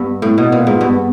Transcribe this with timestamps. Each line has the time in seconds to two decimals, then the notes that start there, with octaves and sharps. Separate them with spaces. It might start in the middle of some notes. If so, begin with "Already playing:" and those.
Already playing: G2 B3
0.22 A2
0.37 B2 B3
0.52 A#2
0.67 G#2
0.81 G2